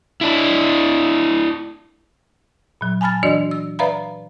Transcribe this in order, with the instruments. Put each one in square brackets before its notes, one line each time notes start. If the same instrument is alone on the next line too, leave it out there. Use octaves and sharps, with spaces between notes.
[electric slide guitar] D4 E4
[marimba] A#2 F#3
G#5 A5 B5 F6 A6
E3 D4 F#4 D5 D#5
E6
B4 D5 E5 F5 A#5 B5